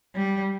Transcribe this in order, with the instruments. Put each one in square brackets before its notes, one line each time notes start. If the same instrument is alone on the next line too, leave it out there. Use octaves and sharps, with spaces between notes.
[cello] G3